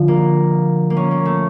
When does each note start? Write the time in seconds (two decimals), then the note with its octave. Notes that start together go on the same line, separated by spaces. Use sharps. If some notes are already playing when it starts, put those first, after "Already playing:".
Already playing: D3 F3
0.08 A#3
0.90 A#3
0.97 C#4
1.11 A#3
1.25 A3